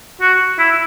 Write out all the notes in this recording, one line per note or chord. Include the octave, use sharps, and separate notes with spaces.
F#4
E4